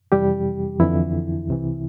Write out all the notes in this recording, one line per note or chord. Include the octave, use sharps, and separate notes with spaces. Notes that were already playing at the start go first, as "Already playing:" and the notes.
F2 C3 E3 G3 G4
F2 D3 E3 E4
C2 C3 E3